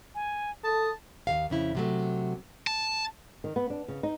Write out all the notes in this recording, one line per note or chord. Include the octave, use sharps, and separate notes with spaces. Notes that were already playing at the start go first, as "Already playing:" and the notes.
G#5
A4 A5 D#6
D#2 C3 F5
F2 C#3 E4
C3 F#3 A3
A5
D#3
B3
D4
C#3
D#4